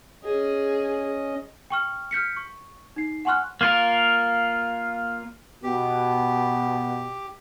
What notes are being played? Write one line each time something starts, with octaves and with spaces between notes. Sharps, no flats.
C#4 G#4 D#5
G5 C#6 F6
F6 G6 B6 C#7
C#6
D#4 C7
F#5 G#5 C6 C#6 F6 F#6
A#3 F4 A#4
B2 G4